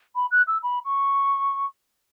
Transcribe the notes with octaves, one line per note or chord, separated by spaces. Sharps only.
B5
F#6
E6
B5
C#6